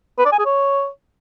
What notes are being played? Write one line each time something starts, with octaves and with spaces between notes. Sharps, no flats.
B4
D5
G#5
G#4
C#5